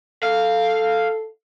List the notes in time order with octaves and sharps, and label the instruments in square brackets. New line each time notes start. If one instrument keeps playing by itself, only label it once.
[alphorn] A4 [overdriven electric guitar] F5